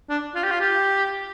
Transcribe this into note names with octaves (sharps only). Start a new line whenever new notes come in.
D4
F4
G4
F4
G4